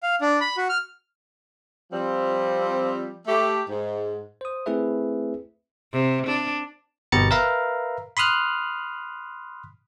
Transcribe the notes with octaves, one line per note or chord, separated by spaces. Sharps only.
F5
D4
B5
F#4
F6
F3 G3 C4
A3 G4
G#2
C5 D#6
A3 C4 E4 G#4 B4 E5
C3
D4
G1 B2 G4 A#5 A6 C#7
A#4 B4 E5 F5 A#5
B5 C6 D#6 F6 F#6